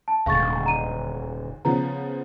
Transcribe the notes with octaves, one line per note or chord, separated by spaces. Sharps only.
A5
D#1 D2 G#2 F5 C#6 A6
A#5 D#7
C#3 F3 B3 A#5